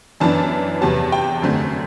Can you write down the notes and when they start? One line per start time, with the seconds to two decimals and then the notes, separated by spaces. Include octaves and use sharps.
0.20 F#2 E3 B3 D4 A5
0.81 E2 C3 F#3 B3 A5
1.12 G5
1.42 F#2 D3 A3 C4